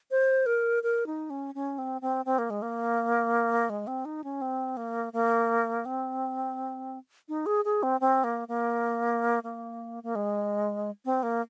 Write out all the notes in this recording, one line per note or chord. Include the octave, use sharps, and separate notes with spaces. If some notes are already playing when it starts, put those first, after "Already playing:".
C5
A#4
A#4
D#4
C#4
C#4
C4
C4
C4
A#3
G#3
A#3
G#3
C4
D#4
C#4
C4
A#3
A#3
C4
D#4
G#4
G#4
C4
C4
A#3
A#3
A#3
A#3
G#3
C4
A#3